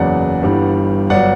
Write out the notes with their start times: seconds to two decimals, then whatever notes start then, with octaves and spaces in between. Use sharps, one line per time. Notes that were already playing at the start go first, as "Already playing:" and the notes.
Already playing: F#1 E2 C#3 F#3 D5 F#5
0.43 G1 G2 E3 G3
1.10 G1 F#3 D5 F#5